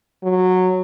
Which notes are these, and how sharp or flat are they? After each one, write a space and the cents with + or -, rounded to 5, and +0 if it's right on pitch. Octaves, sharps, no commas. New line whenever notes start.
F#3 -10